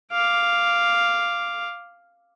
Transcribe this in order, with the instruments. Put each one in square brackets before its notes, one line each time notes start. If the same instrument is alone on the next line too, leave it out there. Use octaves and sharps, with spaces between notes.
[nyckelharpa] F5 D6